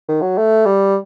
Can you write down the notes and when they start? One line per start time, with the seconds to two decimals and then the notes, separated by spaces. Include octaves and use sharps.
0.08 D#3
0.22 F#3
0.37 A3
0.66 G3